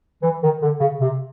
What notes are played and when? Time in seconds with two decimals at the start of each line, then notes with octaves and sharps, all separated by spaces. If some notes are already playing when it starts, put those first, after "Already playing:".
0.22 E3
0.42 D#3
0.61 D3
0.80 C#3
1.00 C3